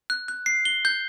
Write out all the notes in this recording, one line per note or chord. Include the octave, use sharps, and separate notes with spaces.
F#6
F#6
C7
G7
G6